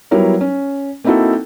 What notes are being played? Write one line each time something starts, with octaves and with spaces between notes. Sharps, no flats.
F#3 G3 B3 E4 A#4 C#5
C#4
A#3 C4 D#4 E4 F#4 A4